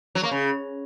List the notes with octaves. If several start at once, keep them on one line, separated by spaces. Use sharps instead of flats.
F#3
A#3
C#3